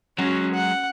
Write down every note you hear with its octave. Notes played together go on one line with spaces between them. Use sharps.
F#3 G#3 C#4 F#4
F#5